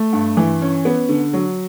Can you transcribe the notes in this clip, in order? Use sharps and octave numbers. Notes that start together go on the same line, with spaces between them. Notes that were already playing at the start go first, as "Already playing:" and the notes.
Already playing: A3
G2
E3
C#4
B3
D3
F#3